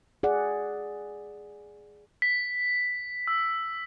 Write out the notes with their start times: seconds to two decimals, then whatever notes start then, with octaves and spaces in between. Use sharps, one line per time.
0.23 G#4 D5 F#5
2.22 B6
3.27 E6